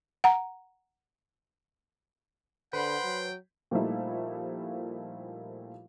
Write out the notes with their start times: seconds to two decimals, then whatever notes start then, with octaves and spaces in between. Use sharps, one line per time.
0.24 F#5 A#5
2.73 D3 B4 C5 F#5 G5 B5 C6
3.04 F#3
3.71 A#2 F3 G3 A3 D#4 E4